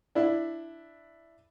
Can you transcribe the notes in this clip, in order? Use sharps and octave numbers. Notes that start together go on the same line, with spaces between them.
D4 E4